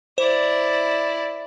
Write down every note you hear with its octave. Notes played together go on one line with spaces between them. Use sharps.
E4 C5 D5